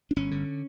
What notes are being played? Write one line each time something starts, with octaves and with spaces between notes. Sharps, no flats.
D4
G1 C#4
D3